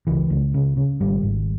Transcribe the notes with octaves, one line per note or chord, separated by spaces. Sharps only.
C#2 E3
C#2
C#3
C#3
G#1 G3
G#1